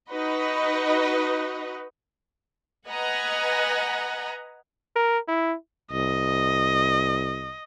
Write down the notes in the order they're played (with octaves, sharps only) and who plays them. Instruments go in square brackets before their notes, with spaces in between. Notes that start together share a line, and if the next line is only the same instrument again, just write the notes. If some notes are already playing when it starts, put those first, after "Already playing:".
[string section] D#4 F#4 B4 D#5
[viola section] B4 D#5 F#5 G#5 A#5
[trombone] A#4
E4
[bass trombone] C2 [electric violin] D#5